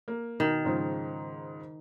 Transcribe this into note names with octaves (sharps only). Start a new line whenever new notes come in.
A#3
B2 D#3
G#2 C#3 F3